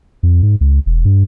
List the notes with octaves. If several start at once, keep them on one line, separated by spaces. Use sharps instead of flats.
F2
G#2
C#2
E1
G2